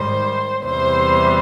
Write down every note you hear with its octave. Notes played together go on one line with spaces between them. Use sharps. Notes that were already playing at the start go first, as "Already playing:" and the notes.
Already playing: G#2 D#3 G3 C5
E2 C3 E3 G3 C5